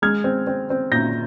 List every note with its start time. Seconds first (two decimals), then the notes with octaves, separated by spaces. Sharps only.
0.02 G#3 F6 G#6
0.24 C4
0.47 C4
0.70 C4
0.92 A#2 G6 A#6